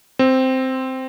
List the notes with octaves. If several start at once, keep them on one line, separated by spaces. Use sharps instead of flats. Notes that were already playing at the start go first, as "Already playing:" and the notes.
C4